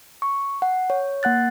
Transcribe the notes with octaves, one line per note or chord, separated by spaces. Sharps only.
C#6
F#5
C#5
A#3 F#5 F#6 A6